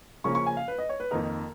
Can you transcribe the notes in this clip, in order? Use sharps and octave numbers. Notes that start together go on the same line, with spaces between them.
C#3 F3 A#3 C#4 C#6
C#6
G#5
F5
B4
D#5
C#5
B4
F2 D#3 A#3 D#4 A#4